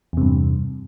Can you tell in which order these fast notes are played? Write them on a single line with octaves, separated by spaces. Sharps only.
E2 C3 G2